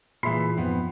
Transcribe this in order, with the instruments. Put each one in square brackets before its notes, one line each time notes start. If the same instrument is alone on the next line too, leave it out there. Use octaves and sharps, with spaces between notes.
[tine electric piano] A#2 G#4 [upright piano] E3 E5 C7 [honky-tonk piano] B5
[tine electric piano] F2 G#2 F3 [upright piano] B3 C4